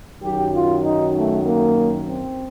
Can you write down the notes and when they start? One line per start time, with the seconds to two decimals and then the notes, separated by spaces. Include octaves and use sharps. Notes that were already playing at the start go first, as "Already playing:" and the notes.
0.23 F#2 D#3 F#3 G4
0.54 F4
0.84 D#4
1.15 A3
1.46 A#3
2.07 C4